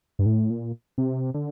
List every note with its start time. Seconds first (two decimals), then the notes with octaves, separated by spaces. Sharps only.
0.19 G2
0.26 A2
0.50 A#2
0.98 C3
1.34 D3